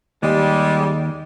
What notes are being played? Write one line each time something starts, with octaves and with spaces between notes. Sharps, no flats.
D#2 G3 G#3